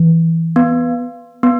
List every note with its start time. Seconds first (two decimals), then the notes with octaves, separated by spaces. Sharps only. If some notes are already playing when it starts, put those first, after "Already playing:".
Already playing: E3
0.56 B3
1.43 B3